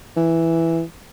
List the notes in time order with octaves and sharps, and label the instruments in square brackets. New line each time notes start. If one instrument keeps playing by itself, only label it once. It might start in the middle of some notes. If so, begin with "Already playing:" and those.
[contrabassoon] E3